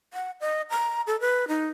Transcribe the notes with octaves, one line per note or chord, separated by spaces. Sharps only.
F#5
D#5
A#5
A4
B4
D#4